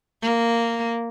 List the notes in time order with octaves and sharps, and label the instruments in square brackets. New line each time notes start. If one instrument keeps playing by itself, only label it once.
[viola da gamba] A#3